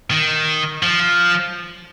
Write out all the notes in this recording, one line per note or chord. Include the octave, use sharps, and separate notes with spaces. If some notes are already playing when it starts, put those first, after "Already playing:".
D#3
F3